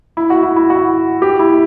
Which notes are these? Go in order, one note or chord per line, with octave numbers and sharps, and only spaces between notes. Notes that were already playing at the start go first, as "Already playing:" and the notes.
E4
F#4
E4
E4
F#4
G4
E4